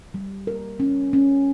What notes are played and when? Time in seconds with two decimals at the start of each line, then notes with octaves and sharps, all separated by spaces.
0.14 G3
0.47 A#4
0.80 C#4
1.13 C#4